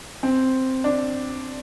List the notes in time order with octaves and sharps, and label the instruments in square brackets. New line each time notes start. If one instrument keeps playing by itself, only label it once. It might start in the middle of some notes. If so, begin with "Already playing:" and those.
[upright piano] C4
D4